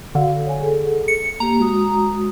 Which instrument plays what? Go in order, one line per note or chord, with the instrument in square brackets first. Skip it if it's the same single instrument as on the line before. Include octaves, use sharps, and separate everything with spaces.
[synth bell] D3 [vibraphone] F#4 A4 F5
[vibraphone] C#5 G#5
G#4 A4
[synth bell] C#7
[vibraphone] A#3 G4 [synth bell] A#5
[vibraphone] G#3 F#4 D#6